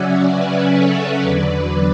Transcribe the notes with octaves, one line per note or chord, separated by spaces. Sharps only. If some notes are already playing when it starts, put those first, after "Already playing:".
Already playing: C#3 F#3 C#4 D5 E5 F#5 G#5
B4 D5
A4 C#5
E2 D3 F#3 B4 D5
B4 D5